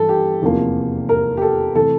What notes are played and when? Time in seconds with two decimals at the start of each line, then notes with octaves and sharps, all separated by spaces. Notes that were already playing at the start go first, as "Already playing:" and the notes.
Already playing: G2 E3 A4
0.09 G4
0.42 F1 E2 C3 F3 A#3
1.09 A#4
1.37 G4
1.42 A4
1.75 C3 E3 A3 A4